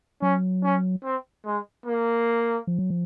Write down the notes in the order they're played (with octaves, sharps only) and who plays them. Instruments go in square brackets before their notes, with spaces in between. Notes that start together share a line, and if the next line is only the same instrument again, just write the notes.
[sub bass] F#3 [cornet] C#4
[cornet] C#4
C4
G#3
A#3
[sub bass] F3
F#3
F3